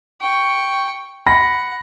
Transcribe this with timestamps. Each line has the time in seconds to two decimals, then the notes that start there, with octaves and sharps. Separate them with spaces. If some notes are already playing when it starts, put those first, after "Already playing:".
0.21 G5 C#6
1.26 F#5 B5 A#6